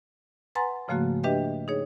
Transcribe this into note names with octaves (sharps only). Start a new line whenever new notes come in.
B4 F#5 G#5 A#5 C6 A6
G#2 C#3 F3 A3 A#3 F#4
D4 G4 B4 D#5 E5 G5
D#4 G#4 C#5